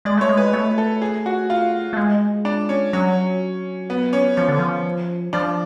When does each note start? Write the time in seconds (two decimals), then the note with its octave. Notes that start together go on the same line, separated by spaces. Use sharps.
0.05 G#3 D5
0.17 A3 C#5
0.29 G#3
0.37 B4
0.53 A3 C#5
0.78 A4
1.02 G#4
1.26 F#4
1.50 F4
1.93 A3
1.97 G#3
2.45 D4
2.69 C#4
2.93 F#3 C#4
3.90 B3
4.13 C#4
4.37 F3 C#4
4.48 D3
4.59 F3
5.33 F3 D4